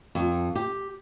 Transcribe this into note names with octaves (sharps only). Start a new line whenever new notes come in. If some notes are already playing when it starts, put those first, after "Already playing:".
F2
G4